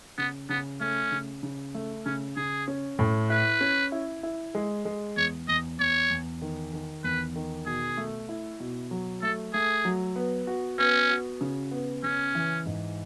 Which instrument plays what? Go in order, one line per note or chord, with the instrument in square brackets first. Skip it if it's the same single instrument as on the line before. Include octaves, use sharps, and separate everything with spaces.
[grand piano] C#3 [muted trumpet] B3
[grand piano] C#3 [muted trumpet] B3
[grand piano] A3 [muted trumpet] C#4
[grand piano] C#3
C#3
A3
[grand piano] C#3 [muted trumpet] C#4
[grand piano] C#3 [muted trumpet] G#4
[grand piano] C#4
A2
[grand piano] E4 [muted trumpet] B4
[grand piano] C#4
E4
E4
G#3
G#3
[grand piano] E2 [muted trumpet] C#5
[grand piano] E2 [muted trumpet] D#5
[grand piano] E2 [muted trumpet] C#5
[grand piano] E2
D#3
D#3
[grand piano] E2 [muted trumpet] B4
[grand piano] D#3
[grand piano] B2 [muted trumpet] G#4
[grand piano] A3
E4
B2
F#3
[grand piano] A3 [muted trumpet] A4
[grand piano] A3 [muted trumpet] G#4
[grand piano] F#3
B3
F#4
[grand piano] B3 [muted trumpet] C#4
[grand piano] F#4
C#3
B3
[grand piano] C#3 [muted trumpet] C#4
[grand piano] E3
G#2